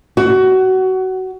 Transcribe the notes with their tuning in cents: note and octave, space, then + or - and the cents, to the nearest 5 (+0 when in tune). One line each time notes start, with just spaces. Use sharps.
F#4 +20